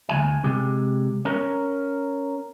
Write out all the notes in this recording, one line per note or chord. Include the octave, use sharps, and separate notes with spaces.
D2 F#3 G#5
C3 G#3 G4
C#4 A#4